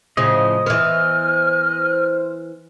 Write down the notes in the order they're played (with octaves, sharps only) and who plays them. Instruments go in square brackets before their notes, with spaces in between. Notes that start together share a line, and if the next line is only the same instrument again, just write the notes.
[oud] A2 C#3 F3 [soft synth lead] C5 [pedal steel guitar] D#5
[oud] E3 B3 [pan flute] F6